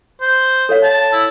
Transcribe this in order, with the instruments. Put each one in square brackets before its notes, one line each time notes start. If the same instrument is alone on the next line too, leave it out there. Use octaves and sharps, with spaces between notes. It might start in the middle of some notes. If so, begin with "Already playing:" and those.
[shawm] C5
[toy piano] A4 C#5 F5
[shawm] A5
E4